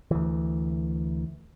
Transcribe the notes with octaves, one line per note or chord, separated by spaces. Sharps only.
D2 E3